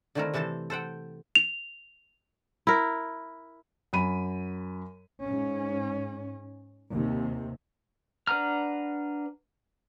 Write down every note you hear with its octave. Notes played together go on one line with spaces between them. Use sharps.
D3 D#3 A3 C4 E4 A#4
C3 E3 A4 C5 A5
A4 C5 F#5 G5
F7
E4 A#4
F#2 B5 D#7
G#2 C#4
D#2 C3
D4 B4 F#5 A#5 F6